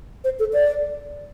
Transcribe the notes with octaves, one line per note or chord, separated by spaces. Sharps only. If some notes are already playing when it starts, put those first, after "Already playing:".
C5
A4
D5